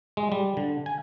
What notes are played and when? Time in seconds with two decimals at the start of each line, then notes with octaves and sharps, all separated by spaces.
0.17 G#3
0.32 G3
0.57 D3
0.86 G#5